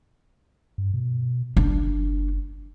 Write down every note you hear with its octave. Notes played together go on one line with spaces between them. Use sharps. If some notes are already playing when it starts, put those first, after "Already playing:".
G2
B2
F#1 D4